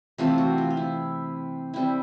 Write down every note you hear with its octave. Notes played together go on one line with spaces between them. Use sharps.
C3 E3 A3 C4 F4
F#4
F4
F4
E4
G3 C4 E4